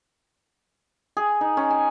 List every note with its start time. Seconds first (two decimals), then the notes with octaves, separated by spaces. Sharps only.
1.17 G#4
1.41 D#4
1.57 C#4
1.71 G#5